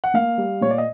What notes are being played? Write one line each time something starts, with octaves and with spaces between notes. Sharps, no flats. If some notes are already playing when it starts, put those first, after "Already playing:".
F#5
A#3 F5
G3
A#2 C#5
D5
D#5